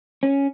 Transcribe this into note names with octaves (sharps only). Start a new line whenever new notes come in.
C#4